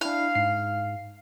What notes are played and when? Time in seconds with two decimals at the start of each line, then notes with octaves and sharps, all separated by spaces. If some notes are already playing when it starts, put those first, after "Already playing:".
0.01 D4 E4 F5
0.35 G#2 C7